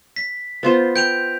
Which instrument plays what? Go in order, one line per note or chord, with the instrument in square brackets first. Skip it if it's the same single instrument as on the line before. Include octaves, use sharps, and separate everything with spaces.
[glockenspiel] B6
[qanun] B3 F4 C5
[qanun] G5 [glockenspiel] G6 D7 F7